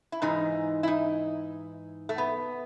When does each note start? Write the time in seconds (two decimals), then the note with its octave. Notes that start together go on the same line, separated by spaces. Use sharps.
0.12 E4
0.22 G#2 E3 D#4
0.83 E4
0.88 D#4
2.09 A3
2.18 B3